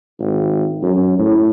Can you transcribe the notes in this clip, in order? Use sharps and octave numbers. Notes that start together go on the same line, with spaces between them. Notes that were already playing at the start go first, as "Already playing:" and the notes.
G#1
F#2
A2